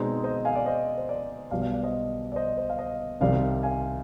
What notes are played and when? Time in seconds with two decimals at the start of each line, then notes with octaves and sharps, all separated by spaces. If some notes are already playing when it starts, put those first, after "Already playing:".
Already playing: B2 G#3 C4 D#4 D5
0.24 C5 D#5
0.45 F5 G#5
0.56 D5
0.66 C5 D#5
0.98 C5
1.09 D5
1.51 B1 B2 G3 D5 F5
1.62 D5 F5
1.72 D5
1.83 C5 D#5
2.32 D5
2.36 C5 D#5
2.57 C5
2.69 F5
2.78 C5 D#5
3.21 C2 C3 D#3 G3 C4 D5 F5
3.63 F5 G#5